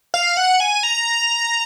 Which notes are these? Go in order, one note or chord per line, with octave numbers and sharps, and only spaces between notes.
F5
F#5
G#5
A#5